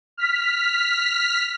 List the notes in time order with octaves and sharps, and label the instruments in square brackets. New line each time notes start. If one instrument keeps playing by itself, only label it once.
[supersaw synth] F6 B6